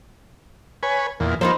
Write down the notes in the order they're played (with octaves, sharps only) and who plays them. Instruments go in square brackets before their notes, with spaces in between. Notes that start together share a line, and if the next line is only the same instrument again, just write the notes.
[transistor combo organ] B4 C#5 G#5
E2 A#2
[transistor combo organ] F3 A#3 [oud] D#4 B4 C5